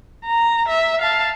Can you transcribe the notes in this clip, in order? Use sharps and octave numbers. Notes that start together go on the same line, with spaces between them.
A#5
E5
F5 A5